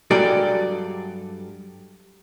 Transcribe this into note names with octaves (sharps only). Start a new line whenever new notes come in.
G2 F#3 G#3 G4 A4 D5